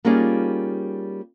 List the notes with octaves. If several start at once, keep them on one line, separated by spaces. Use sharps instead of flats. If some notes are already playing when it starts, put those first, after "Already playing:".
G3 A#3 C#4 D#4 F4 G#4